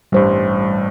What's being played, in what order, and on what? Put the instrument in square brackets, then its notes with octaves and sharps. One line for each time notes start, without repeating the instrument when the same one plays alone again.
[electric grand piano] A1 G2 [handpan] G3 C5